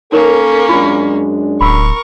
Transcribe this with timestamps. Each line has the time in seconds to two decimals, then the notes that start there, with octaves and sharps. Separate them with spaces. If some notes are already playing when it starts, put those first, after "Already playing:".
0.12 A#3 C#4 D#4 A4 A#4 C#5
0.69 F#2 G#3 D4 F4
1.61 D1 A#4 B5 C#6 E6